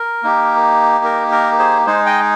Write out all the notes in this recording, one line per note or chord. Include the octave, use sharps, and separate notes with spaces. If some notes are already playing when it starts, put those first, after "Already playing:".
Already playing: A#4
A#3 D#4 G4
A#4
A#4
G#4 C5
G#3 D#4 G#4 C5
D#5 G5